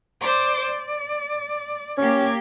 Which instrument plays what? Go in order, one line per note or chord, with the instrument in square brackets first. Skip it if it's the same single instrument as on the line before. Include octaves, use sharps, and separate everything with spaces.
[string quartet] C5 D5 D6
D5
[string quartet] A#3 G4 G#6 [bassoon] C#4